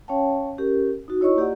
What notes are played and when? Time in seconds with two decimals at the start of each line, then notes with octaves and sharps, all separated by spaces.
0.08 C#4 C#5 F5 G5 A5
0.58 C#4 G4 A#4
1.08 D#4 F#4
1.21 E4 C#5 D#5 C#6 E6
1.36 A#3 F4 G4 D5 D#5 F#5